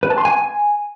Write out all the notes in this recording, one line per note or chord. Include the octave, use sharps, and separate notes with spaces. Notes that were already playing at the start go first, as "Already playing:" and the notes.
B4
A5
C6
G#5